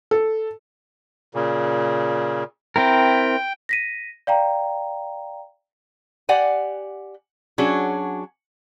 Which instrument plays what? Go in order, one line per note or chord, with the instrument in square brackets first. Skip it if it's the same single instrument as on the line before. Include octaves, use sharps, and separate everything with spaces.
[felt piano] A4
[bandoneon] A#2 C#3
[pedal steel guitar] C4 E4 A#4 [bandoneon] G5
[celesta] A#6 B6 D#7
D5 F5 G5 A#5
[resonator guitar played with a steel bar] G4 D5 F#5 G#5
F#3 C#4 D4 F#4 G#4